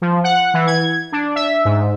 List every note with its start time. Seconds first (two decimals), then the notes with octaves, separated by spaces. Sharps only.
0.02 F3
0.24 F#5
0.54 E3
0.67 G#6
1.12 D4
1.36 E5
1.65 G#2